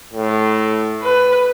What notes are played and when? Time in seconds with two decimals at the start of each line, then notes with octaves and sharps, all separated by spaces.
0.13 A2
1.03 B4